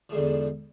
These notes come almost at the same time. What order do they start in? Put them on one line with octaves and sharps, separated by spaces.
F3 G#2 D3 E2